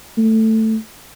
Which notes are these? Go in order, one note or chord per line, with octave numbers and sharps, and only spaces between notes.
A3